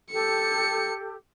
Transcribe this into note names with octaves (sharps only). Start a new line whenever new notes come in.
G4 A4 C#7